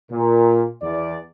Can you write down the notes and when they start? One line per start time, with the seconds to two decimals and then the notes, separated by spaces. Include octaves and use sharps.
0.11 A#2
0.82 E2 D5